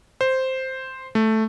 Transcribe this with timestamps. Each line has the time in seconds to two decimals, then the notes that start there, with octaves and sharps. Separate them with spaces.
0.21 C5
1.15 A3